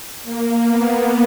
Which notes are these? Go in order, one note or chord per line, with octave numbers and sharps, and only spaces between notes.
A#3
B3